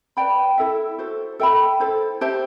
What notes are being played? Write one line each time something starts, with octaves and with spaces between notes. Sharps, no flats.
B4 D5 G5 B5
E4 A4 E5
F#4 A4 C5
A4 E5 G5 B5
E4 A4 C5
G4 C5 E5 A5